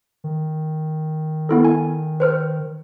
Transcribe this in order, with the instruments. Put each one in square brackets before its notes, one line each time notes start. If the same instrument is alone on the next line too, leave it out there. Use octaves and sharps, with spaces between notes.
[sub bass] D#3
[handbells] B3 E4 A4
G#5
B4 C5 F6